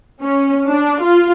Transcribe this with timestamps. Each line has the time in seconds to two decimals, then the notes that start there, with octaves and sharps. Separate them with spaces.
0.21 C#4
0.68 D4
1.02 F4